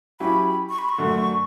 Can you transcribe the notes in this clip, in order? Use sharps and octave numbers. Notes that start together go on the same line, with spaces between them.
F#3 C#4 E4 G4 C#5 B5
C#6
B5
C#6
F#2 D3 A3